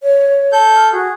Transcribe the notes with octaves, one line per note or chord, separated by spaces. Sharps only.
C#5
A4 G6
F6
F#4 G#4